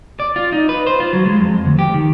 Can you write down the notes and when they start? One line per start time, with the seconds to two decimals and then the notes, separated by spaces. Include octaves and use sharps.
0.20 D5
0.36 F4
0.52 D#4
0.69 B4
0.87 C5
1.00 F4
1.13 F#3
1.25 G#3
1.41 F2
1.65 D2
1.79 G4
1.94 D#3